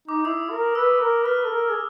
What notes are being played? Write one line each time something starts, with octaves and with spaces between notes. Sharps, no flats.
D#4 D6
E4 D#6
A#4
B4 E6
A#4
B4 F6
A4
A#4
G#4